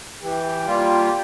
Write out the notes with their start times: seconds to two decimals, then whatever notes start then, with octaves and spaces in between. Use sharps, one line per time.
0.22 E3 G4
0.66 G3 A#3 F4